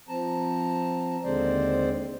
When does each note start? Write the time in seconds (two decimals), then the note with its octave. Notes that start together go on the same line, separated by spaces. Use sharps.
0.08 F3 C4 A5 A#5
1.24 D#2 D3 G#3 C4 C5 D5